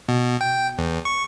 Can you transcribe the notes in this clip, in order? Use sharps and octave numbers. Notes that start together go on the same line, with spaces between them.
B2
G5
E2
C#6